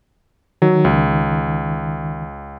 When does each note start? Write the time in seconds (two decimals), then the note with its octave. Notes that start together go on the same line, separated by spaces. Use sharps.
0.62 D#3 F#3
0.85 C#2